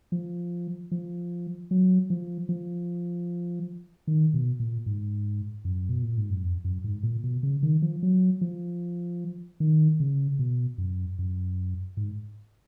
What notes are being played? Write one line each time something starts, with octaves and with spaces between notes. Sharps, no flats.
F3
F3
F#3
F3
F3
D#3
B2
A#2
G#2
F#2
B2
A#2
G#2
F#2
F2
F#2
G#2
A#2
B2
C#3
D#3
F3
F#3
F3
D#3
C#3
B2
F#2
F#2
G#2